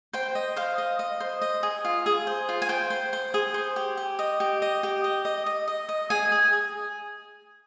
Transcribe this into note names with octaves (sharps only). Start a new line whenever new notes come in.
C5 G5
D#5
C5 F5
D#5
D#5
C5
D#5
G#4
F4
G#4
C5
F4
G#5
C5 G5
C5
C5
G#4
C5
G4
G4
D#5
G4
D#5
G4
D#5
D#5
D#5
D#5
D#5
G#4 G#5
G#4
G#4